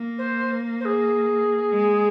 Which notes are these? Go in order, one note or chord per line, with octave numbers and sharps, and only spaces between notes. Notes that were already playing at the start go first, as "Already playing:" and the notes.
Already playing: A#3
C5
C5
G#4
G#3